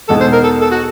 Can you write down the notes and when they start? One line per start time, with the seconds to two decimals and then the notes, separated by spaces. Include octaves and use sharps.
0.09 E2 B2 G#3 B3 D#4 A4
0.21 C5
0.32 A#4
0.44 A4
0.62 A4
0.71 F#4